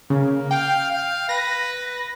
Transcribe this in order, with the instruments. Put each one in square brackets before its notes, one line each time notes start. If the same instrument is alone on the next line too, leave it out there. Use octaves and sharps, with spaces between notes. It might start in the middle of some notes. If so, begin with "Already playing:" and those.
[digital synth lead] C#3 [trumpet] A#3
[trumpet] F5 [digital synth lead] G5
[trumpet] F5
[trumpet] B4 [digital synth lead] A#6